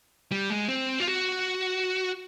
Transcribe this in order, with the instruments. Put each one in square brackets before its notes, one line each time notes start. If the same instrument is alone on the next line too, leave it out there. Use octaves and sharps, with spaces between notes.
[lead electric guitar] G3
G#3
C4
F4
F#4